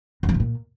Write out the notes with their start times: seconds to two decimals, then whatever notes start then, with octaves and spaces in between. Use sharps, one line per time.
0.23 F#2
0.29 F3
0.34 A2
0.40 A#2